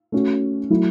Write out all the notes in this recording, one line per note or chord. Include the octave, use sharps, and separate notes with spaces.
A3 C#4 F#4
F#3 A3 E4